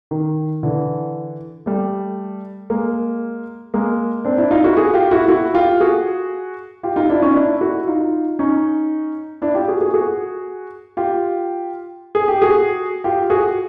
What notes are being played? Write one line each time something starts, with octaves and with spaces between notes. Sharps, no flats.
D#3
D3 E3
G3 A3
G#3 A#3
G#3 A#3
C4 D4
D4 E4
D#4 F4
E4 F#4
F#4 G#4
F4 G4
E4 F#4
E4 F#4
F4 G4
F#4 G#4
F4 G4
D#4 F4
D4 E4
C#4 D#4
D4 E4
E4 F#4
D#4 F4
C#4 D#4
D4 E4
F4 G4
F#4 G#4
F#4 G#4
F#4 G#4
F4 G4
G#4
G4
F#4 G#4
F4 G4
F#4 G#4